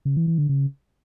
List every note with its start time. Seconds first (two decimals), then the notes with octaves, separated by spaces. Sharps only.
0.05 C#3
0.16 E3
0.27 E3
0.38 D3
0.49 C#3